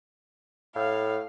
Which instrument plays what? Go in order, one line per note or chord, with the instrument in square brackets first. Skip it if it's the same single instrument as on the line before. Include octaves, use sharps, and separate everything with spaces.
[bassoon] A2 [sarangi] F5